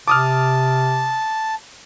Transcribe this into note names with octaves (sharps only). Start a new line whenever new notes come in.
C3 A5 D6 D#6 F6